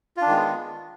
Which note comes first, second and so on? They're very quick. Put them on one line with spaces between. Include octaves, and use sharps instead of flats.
F4 D4 D#3 G#3 B3